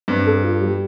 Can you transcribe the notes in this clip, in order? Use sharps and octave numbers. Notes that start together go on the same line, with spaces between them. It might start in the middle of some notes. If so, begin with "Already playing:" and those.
G2 C4
A4
F4
G3